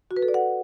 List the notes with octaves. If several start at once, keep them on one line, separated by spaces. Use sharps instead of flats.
F#4
B4
A4
D5
F#5